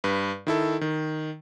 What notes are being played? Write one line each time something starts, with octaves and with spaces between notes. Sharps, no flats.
G2 B4
D#3 E4 A4
D#3